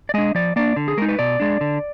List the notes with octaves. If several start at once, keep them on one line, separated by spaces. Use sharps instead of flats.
D5
G#3 D4 D#5
F3 D5
A#3 D4 D5
D3
G#4
G#3 D#4 A#4
B4
B2 D5
G#3 D4
D3